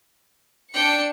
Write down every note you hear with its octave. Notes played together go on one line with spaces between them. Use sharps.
D4 G5 C#7